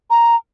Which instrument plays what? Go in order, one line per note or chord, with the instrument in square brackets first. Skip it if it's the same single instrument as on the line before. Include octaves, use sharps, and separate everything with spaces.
[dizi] A#5